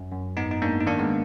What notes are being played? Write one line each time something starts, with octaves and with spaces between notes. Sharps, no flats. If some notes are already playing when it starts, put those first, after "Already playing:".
Already playing: F#2
F#2
G#2 B3 D#4
D#4
G#2 A#3 D4
D#4
D#3 A#3 D4
G#3 B3